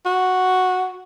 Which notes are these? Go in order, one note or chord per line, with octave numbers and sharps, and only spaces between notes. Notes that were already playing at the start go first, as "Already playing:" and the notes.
F#4